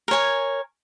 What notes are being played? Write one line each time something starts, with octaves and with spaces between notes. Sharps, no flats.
A#4 C#5 G#5